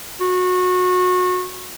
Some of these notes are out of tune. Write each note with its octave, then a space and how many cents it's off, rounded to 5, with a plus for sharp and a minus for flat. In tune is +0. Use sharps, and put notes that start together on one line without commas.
F#4 -25